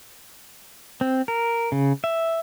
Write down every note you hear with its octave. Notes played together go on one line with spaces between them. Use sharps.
C4
A#4
C#3
E5